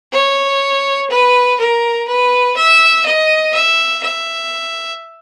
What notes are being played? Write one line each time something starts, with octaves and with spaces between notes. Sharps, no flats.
C#5
B4
A#4
B4
E5
D#5
E5
E5